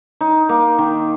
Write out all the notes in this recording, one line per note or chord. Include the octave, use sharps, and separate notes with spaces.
D#4
A#3
D#3